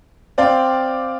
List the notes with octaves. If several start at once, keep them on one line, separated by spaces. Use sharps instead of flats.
C4 D5 F5 G5